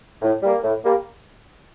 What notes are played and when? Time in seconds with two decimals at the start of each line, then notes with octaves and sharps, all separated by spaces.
0.21 A2
0.42 G3 A#3
0.63 A2
0.83 G3 A#3